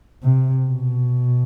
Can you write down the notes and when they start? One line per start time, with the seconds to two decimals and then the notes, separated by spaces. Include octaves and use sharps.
0.23 C3
0.66 B2